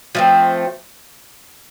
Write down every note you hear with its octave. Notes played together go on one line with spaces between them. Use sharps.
F3 A3 C4